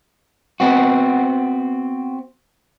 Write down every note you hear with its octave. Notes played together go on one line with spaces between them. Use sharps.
B3 C4 F#4